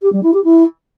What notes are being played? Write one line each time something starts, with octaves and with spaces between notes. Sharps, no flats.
G4
G3
E4
G4
E4